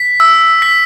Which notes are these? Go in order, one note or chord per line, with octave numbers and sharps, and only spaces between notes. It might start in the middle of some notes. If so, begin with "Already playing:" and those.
Already playing: B6
E6
B6